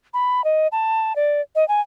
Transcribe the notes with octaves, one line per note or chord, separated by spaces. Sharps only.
B5
D#5
A5
D5
D#5
G#5